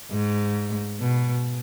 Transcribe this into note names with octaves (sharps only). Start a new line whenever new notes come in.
G#2
B2